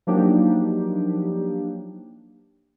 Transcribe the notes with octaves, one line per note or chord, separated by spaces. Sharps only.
F3 F#3 A#3 D4 D#4 G4